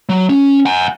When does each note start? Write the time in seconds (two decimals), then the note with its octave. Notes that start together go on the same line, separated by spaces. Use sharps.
0.09 F#3
0.29 C#4
0.66 F#5 G#5